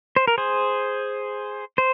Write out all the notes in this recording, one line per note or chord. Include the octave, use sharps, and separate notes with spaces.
C5
A#4
G#4 C5
C5